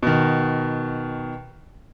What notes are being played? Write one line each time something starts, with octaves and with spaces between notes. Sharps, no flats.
B2 D#3